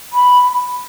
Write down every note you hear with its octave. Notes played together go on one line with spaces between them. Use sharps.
B5